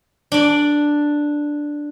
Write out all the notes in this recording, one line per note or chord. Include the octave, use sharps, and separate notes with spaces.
D4 D5